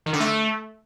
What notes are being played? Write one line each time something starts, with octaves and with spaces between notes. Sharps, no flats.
D#3
D3
A3